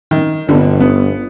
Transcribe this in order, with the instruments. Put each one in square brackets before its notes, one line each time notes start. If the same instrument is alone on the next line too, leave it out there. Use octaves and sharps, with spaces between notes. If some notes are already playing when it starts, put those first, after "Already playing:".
[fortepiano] D#3
[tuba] G1 [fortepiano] B2 D3 G3
[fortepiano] B3